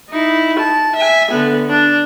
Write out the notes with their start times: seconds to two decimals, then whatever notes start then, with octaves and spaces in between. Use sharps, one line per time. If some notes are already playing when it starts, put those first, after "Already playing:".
0.10 D#4 E4
0.59 A5
0.96 E5 G#5
1.31 D3 B3
1.69 D4